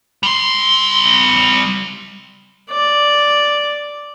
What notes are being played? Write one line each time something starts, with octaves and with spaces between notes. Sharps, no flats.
G3 C6
D5